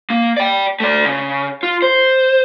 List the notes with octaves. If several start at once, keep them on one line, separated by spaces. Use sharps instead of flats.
A#3
D5 G5
A3 D5
C#3
F4
C5